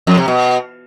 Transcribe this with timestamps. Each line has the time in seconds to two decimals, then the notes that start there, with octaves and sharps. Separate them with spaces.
0.07 F2
0.17 C3
0.28 B2